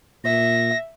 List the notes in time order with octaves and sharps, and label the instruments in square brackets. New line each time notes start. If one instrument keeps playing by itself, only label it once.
[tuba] A#2 [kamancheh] E5 [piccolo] A#6